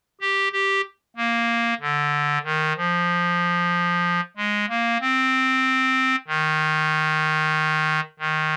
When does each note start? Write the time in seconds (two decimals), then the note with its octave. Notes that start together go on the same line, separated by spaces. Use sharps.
0.21 G4
0.53 G4
1.17 A#3
1.81 D3
2.45 D#3
2.76 F3
4.37 G#3
4.69 A#3
5.00 C4
6.28 D#3
8.20 D#3